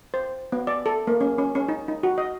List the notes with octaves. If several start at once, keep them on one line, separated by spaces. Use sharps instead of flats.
C5
B3
D5
A4
A#3
C#4
C#4
C#4
D#4
D#4
F#4
D#5